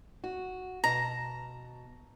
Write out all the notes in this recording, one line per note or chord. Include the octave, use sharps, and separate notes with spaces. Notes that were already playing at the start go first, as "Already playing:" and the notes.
F#4
B2 D#5 A5 A#5